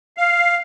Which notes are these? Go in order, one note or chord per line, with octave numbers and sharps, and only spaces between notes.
F5